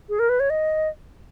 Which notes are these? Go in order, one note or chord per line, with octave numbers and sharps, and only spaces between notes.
G#4
A#4
B4
C#5
D#5